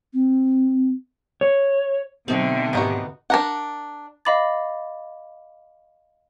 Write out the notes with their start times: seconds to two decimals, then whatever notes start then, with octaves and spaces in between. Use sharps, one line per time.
0.13 C4
1.41 C#5
2.28 B2 D3 F#3 A3 C4 D#4 C5
2.73 D#2 G#2 B3 D#4 F#4 G4
3.30 D4 A#4 F#5
4.25 D#5 F5 B5 D6 A6